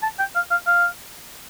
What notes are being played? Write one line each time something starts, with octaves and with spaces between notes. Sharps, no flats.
A5
G5
F5
F5
F5